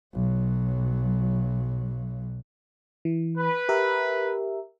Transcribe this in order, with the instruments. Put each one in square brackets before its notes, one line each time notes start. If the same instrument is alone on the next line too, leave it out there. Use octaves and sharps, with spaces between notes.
[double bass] B1 F#3
[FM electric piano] E3
[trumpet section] B4
[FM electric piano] G4 A#4 E5